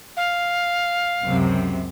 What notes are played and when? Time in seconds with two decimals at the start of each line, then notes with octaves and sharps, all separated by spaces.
0.16 F5
1.24 C#2 F#2 C3